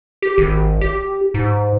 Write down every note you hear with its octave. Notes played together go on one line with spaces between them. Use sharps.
G4
G#1
G4
G#2